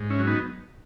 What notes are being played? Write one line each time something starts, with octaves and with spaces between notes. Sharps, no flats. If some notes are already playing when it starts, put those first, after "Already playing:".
Already playing: G#2
C#4 E4
F#3
B3 D#4